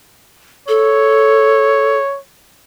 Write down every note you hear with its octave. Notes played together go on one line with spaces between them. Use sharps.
A4 C#5